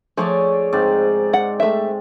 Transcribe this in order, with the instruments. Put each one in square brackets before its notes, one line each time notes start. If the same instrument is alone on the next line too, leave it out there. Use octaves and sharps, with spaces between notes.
[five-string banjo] F3 A3 [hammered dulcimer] G#4 C#5 D5
[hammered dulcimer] G#2 C4 D5
[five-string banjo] F#5
A3 E5